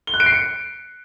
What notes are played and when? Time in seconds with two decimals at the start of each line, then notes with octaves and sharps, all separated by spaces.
0.07 G7
0.14 F#6
0.20 D7
0.26 C7
0.33 C#7